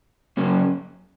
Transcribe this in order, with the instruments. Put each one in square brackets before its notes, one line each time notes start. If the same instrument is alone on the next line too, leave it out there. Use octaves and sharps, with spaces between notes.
[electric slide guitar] F#2 C#3 F#3 A#3 C#4